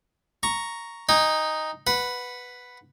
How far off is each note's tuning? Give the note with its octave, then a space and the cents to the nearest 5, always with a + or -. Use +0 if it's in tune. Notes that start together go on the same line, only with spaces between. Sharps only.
A#5 +0 C#6 +0
D#4 +0 G#5 -45
B4 +0 F#5 -15